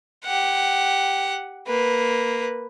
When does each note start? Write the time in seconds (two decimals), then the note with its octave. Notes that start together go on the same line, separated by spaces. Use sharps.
0.25 G4 F#5
1.67 A#3 B4